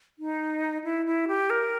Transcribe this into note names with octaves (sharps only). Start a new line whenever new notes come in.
D#4
E4
E4
G4
A#4